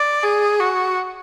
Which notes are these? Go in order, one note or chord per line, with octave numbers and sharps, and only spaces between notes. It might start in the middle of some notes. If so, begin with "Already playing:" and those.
Already playing: D5
G#4
F#4